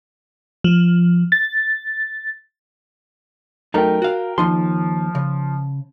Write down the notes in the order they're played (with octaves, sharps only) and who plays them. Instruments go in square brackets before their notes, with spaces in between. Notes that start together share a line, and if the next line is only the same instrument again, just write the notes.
[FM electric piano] F3
A6
[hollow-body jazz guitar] F#2 A3 D#4 [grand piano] A#4 G5
[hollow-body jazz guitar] F#4 F5
[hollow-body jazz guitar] D#2 D#4 C6 [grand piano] F3
[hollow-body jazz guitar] C#3